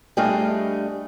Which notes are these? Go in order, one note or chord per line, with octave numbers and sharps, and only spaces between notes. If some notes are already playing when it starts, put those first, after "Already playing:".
G3 A3 D4 G#4 D#5 F5